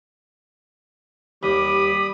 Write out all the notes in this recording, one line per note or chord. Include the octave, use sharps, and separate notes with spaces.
D#2 G3 B5 D6 D#6